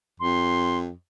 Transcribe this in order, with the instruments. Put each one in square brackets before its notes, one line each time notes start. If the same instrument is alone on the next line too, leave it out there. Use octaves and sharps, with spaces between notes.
[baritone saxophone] F2 [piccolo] C6